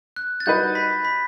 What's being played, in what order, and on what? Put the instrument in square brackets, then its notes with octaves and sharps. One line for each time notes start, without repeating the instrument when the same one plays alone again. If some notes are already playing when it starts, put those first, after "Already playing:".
[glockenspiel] F#6
A6
[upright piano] G3 D#4 F#4 B4 D#5 [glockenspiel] G6
[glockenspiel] B5 B6
B5 B6